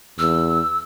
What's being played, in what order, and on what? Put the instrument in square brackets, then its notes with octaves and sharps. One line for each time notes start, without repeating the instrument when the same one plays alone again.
[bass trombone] E2 [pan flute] E6